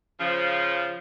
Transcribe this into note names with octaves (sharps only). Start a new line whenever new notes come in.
C#3 F3